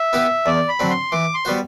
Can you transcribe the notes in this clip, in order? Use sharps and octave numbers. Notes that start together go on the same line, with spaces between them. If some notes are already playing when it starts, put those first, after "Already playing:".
Already playing: E5
B3 E4 G4 B4
E2 D5
B5
D3 F#3 C4
C6
E3 D6
C6
G3 B3 F#4 C5